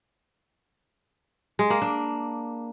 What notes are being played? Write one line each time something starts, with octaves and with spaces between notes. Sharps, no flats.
G#3
A#3
D4